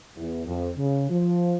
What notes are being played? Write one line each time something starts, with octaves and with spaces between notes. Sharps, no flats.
E2
F2
C#3
F3